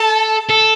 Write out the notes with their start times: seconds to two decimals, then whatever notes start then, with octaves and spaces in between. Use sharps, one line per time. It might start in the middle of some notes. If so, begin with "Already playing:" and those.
Already playing: A4 A5
0.50 A4